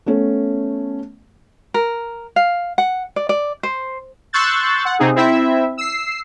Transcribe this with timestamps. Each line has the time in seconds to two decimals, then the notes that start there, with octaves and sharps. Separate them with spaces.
0.06 A3 B3 C#4 A4
1.74 A#4
2.36 F5
2.78 F#5
3.16 D5
3.29 D5
3.63 C5
4.33 C6 C#6 E6 F#6 G6 A6
4.85 F#5
4.99 C3 C4 D#4 G#4
5.16 C4 E4 E5
5.77 E6 C7